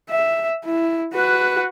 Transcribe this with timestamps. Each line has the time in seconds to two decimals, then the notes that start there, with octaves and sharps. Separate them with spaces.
0.10 E5
0.65 E4
1.13 F#4 B4